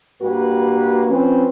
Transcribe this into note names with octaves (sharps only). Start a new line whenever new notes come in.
G2 G3 A#3 F#4 B4
F3 C4 C#4 B4